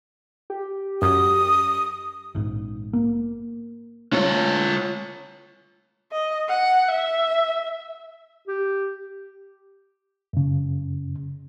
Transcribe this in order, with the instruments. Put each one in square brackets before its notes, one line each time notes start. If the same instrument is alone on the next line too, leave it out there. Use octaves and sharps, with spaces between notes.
[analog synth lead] G4
[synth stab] F#2 [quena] D#6
[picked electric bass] A#1 G#2
A#3
[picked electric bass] G3 A3 [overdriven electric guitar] F4 C#5
[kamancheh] D#5
F#5
E5
[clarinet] G4
[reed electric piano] F#2 C#3